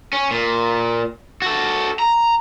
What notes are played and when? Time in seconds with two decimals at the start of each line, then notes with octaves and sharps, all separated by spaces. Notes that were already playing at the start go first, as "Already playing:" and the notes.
0.13 C#4
0.31 A#2
1.42 F#4 A4
1.99 A#5